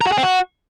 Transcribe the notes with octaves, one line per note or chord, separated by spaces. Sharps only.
A#4
F#4
G#4
C4
F#4